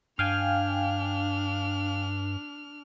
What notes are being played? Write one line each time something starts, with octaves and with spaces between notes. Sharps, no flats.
G2 D4 F5 G5 G#5 F6